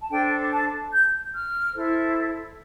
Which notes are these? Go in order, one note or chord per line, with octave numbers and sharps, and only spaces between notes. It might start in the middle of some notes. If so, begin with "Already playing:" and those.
A5
D4 A4 C5 G5
A5
G6
F6
E4 A4 C5